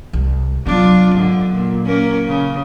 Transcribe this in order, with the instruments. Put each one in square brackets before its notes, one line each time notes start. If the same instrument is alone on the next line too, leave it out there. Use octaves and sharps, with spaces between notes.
[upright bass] C2
[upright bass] F#3 B3 [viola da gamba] D4 F4
[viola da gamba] G#2 D3
A#2
A#3 C#4 A#4
C#3